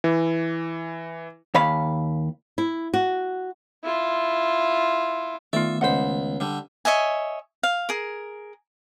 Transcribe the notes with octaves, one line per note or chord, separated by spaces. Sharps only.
E3
D#2 C#5 F5 B5
E4
F#4
E4 F4
D#3 A3 B3 F4 D5 E5
C#2 C5 D#5 F#5 B5
D3 G3
C#5 D#5 E5 G#5
F5
G#4 A#4